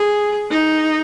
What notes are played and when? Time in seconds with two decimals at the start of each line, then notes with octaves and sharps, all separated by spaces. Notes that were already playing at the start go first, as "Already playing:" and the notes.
Already playing: G#4
0.51 D#4